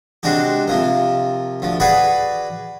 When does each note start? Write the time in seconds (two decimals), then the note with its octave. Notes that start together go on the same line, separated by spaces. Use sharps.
0.23 C3 G#3 D4 F#4 G4
0.68 C3 F3 A#3
1.62 D2 F3
1.80 F#4 G#4 B4 D5 F#5 B5